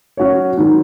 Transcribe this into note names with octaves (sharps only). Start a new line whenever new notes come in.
F#3 C#4 F#4 C#5
G#2 D#3 F#3